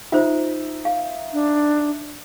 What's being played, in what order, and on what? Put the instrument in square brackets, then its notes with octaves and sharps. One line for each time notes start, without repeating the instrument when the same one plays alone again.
[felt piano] D#4 E5 [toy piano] F4 C5
[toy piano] F5
[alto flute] D4